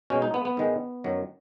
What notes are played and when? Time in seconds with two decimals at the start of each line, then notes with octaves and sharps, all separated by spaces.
0.10 B2 G#3 C#4
0.22 D#4
0.34 B3
0.45 B3
0.57 G#2 D#3 G#3
1.04 F#2 D#3 F#3